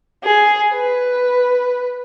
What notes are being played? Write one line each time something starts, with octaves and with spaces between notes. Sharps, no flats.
G#4
B4